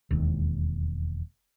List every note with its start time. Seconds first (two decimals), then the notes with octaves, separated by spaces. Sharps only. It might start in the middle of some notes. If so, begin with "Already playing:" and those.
0.11 E1 D#2